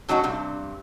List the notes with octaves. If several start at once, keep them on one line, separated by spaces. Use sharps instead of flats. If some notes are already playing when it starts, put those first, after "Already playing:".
A2 F#3 C#4 D#4 F#4
G2 C3